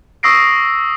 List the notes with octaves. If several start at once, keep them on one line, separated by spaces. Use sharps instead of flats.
C#6 D#6 E6 A#6 C7 D7